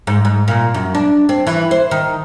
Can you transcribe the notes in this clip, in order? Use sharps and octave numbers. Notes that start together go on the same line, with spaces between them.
G#2
G#2
A#2
F#2
D4
C4
E3
C5
D#3